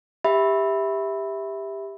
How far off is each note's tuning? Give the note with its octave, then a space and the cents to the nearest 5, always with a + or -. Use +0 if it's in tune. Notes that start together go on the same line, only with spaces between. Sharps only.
G4 +15 E5 -10 B5 +0